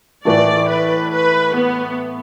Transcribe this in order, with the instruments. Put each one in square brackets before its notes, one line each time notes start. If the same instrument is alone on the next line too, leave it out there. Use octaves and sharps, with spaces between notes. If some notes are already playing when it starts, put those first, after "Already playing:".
[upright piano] A2 E3 A3 [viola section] D5
[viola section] B4
B4
B3